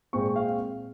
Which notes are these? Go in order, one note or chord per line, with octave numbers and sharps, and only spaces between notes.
A#2 G#3 C4 C#6
F5